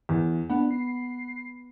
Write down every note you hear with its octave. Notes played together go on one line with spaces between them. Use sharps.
E2
B3 D4 F#5
C7